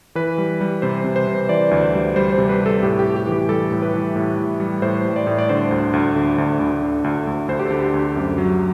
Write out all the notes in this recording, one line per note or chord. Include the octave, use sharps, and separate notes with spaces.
E3 B4
G3
G3
C3 C5
C3
C5
C3
E3 D5
D2
C5
G3
G3 C5
C5
C3
B4
C3
A4
A2 G4
G4
A2
G4
E3
G4
G3 A4
A2
B4
E3
A2
E3
G3
A2 C5
G3
D5
A2
D5
D3 C5
D2
D2
D3
D2
D2
D3
D2
D2
D2 C5
G4
A4
D3
G4
D2
G4
F#2
F#3